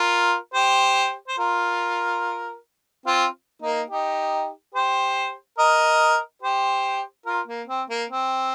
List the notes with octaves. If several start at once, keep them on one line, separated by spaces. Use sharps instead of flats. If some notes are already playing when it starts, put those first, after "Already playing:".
Already playing: F4 A#4
G4 C5
C5
F4 A#4
C4 F4
A#3 D#4
D#4 G4
G4 C5
A#4 D#5
G4 C5
F4 A#4
A#3
C4
A#3
C4